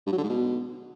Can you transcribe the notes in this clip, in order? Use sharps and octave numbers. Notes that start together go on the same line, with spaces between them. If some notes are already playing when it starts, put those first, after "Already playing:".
G2
F#3
D3
G#2
B2